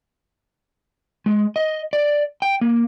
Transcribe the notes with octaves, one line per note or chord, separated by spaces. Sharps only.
G#3
D#5
D5
G5
A#3